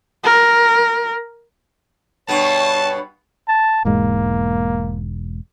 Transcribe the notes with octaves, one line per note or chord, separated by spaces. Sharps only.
A#4
G2 B2 B3 C#5 A5
A5
E1 G#2 G#3 A#3